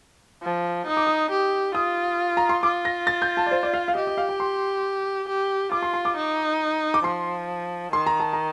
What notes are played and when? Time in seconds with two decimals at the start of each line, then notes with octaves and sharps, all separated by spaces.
0.42 F3
0.86 D#4 D#6
0.97 D6
1.07 D#6
1.31 G4
1.75 F4 D#6
2.37 A#5
2.49 C6
2.63 F4 D6
2.85 A#6
3.07 A6
3.22 G6
3.37 A5
3.46 D5
3.51 C5
3.63 D5
3.73 F5
3.88 F5
3.95 G4 D#5
4.07 D#5
4.17 F5
4.29 G5
4.40 C6
5.28 G4
5.72 F4 D6
5.82 C6
5.94 C6
6.05 D6
6.16 D#4
6.94 D6
7.04 F3 C6
7.92 D#3 C6
8.06 A#5
8.20 A5
8.33 A#5